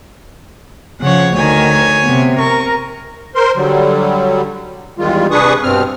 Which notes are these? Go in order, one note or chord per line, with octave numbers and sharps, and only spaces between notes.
C#3 F3 C#5 F#5
D2 D#3 C#5 G#5
C3 B3
A#4 C#6
A#4 C5 C6
D3 F#3 G3
E2 D#3 G3 G#3 F4
C3 D4 G#4 B4 C#6 D#6
G2 B2 C4 F6